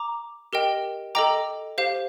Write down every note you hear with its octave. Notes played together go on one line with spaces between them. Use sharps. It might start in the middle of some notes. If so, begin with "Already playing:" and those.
Already playing: A#5 D6
G4 A#4 D#5 G5
A4 D#5 G5 A#5 D6
G4 C5 F5